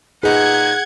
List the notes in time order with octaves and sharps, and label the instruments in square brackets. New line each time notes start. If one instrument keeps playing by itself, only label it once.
[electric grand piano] A#2 D#4 B4 [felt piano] G#4 [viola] F#5 [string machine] G#6